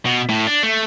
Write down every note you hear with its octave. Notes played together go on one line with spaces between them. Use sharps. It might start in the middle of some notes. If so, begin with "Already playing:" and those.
B2
A2
D4
A3